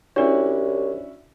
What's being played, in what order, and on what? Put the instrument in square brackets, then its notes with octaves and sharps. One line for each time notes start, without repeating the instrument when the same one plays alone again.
[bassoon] C2 [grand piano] C#4 E4 F#4 [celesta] D4 D5 [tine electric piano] C#5